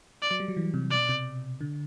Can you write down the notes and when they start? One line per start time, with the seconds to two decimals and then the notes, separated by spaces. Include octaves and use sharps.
0.22 D5
0.31 F#3
0.40 G3
0.48 F#3
0.57 E3
0.74 C3
0.91 B2 D5
1.09 C3
1.61 D3